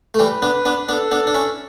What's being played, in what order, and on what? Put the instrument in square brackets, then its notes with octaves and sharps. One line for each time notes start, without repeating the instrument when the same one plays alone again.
[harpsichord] A3
[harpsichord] E3 G3 [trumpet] B4
[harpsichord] B3 D4
B3 D4
[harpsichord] B3 D4 [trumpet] A4
[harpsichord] B3 D4
D4
C#4 E4